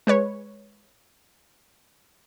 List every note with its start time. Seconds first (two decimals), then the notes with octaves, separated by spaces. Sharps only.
0.07 G#3 B4 C#5